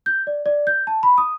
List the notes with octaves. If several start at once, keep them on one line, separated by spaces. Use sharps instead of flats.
G6
D5
D5
G6
A5
B5
D#6